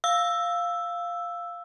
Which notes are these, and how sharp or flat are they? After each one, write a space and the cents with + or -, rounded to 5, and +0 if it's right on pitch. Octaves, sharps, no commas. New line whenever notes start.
F5 +0 E6 +5